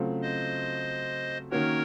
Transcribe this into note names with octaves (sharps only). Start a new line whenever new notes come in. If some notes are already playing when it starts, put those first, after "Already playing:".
Already playing: C#3 F#3 A3 C4 F4
C5 D#5
D#3 A#3 C#4 F#4 A#4 C#5